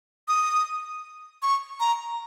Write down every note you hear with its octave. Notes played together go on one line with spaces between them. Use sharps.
D#6
C#6
A#5